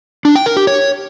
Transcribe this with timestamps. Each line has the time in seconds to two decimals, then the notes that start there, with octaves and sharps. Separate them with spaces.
0.25 D4
0.35 G5
0.46 A#4
0.57 G4
0.67 C#5